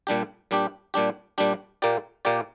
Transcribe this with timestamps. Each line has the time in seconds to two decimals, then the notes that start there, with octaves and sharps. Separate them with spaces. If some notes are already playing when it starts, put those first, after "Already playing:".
0.07 A#2 G3 D4 G4
0.51 A#2 G3 D4 G4
0.94 A#2 G3 D4 G4
1.38 A#2 G3 D4 G4
1.82 A#2 A#3 G4 D5
2.25 A#2 A#3 G4 D5